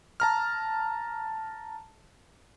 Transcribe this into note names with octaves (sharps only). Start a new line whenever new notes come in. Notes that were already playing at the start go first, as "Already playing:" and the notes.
A5 A#5 F6